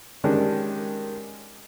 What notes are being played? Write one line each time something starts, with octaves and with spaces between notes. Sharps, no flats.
D#3 G3 G#3 C#4 D4